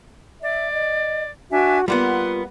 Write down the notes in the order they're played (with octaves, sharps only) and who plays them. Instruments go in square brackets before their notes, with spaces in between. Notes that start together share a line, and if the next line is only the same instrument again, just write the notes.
[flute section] D5 [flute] E5
[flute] D#5
[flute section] D4 E5 G#5 [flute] F#4
[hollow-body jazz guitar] G3 A#3 B3 [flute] F4 [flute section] F#5 C6